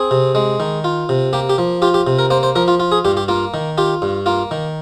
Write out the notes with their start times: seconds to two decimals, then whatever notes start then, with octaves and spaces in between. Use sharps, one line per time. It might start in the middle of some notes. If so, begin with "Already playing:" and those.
Already playing: C4 G#4
0.11 C3
0.35 G#3
0.60 D#3
0.84 F4
1.09 C3
1.33 A#3 G4
1.49 G4
1.58 F3
1.82 F4 G4
1.94 G4
2.07 C3
2.19 A#4
2.30 A#3 C5
2.43 C5
2.56 F3 A#4
2.68 F4
2.80 F4
2.92 G#4
3.05 G2 G4
3.17 G4
3.28 A#3 F4
3.54 D#3
3.78 F4 G4
4.02 G2
4.26 A#3 F4
4.51 D#3